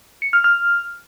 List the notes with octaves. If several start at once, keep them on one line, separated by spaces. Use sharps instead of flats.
C#7
F6
F6